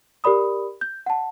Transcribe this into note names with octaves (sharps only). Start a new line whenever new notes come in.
G4 A#4 D5 B5 D#6
G6
F#5 A5